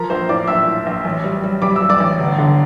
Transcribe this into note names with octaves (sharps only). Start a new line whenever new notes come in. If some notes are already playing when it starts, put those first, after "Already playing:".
Already playing: F3 A#4 A#5
A#1 C5 C6
A2 D5 D6
A#1 E5 E6
A2
A#1
A1
G3
G3
G3 D6
E6
G3
D5 D6
A1
G1
D3